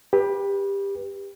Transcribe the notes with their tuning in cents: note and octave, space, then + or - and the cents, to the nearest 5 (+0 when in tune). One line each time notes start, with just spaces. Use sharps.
G4 +20 B4 -20